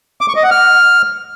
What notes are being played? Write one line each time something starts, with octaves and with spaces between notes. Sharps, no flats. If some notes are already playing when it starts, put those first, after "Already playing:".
D6
C#6
D#5
F#5
F6